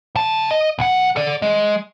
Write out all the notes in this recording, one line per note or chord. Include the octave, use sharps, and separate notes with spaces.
C#3 A5
D#5
B1 F#5
A4 D5
G#3